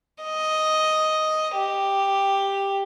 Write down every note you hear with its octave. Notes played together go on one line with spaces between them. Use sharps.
D#5
G4